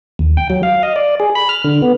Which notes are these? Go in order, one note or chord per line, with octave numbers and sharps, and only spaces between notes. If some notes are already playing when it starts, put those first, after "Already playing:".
D#2
G5
F#3
F5
D#5
D5
G#4
B5
F6
D3
B3